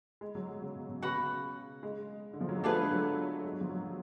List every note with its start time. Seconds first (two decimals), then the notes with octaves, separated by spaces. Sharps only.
0.21 G#3
0.35 F#3
0.49 G#3
0.61 C#3
0.75 B2
0.89 B2
1.02 C#3 F#4 B4 F#5 B5
1.83 G#3
2.33 D3
2.41 F3
2.49 F#3
2.56 G#3
2.63 A3 D4 F4 G#4 B4
2.77 G#3
2.91 F#3
3.44 G#3
3.53 F#3
3.61 F3
3.70 F#3